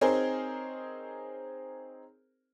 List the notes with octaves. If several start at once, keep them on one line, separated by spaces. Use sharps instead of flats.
C4 D#4 G#4 A#4 C5 C#5